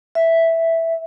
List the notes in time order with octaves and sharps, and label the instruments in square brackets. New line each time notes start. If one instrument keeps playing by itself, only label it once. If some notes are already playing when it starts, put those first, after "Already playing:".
[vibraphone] E5